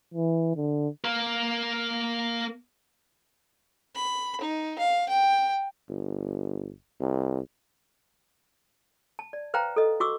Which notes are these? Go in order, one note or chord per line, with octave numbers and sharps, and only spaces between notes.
E3
D3
A#3 A#4
B5
D#4
F5
G5
G1
C2
A5
D5
B4 C5 F5 G5 A#5
A4 D#5
F#4 C#6 D6 E6